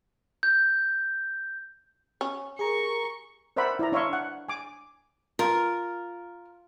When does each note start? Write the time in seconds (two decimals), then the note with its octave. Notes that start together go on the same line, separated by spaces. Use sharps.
0.43 G6
2.21 C#4
2.59 G4 G#4 A#4 A#5 C#6
3.56 A#4 C5 D5 E5 F#5 B5
3.79 E4 D5 A#5
3.92 D4 C#5 E5 F5 C6 C#6
4.13 F#5
4.49 G#5 D6
5.39 F4 A#4